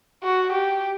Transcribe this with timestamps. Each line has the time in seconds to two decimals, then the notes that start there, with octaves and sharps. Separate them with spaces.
0.23 F#4
0.52 G4